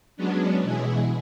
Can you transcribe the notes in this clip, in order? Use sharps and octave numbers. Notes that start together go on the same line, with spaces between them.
F#3 G#3 B3 C#4 D4
B2 E3 G#3 E4 G#4